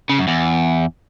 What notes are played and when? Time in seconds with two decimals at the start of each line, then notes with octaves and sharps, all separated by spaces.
0.09 C#3
0.19 F#2
0.28 E2